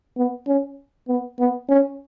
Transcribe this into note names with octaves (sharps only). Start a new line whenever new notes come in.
B3
C#4
B3
B3
C#4